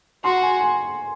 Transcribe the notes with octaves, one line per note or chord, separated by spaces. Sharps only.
F#4 C6
G#5
G#5